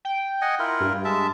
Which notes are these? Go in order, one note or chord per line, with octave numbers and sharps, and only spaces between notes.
G5
D#5 F#5 G#5
E4 F4 A#4
G2
G#3 E5 A5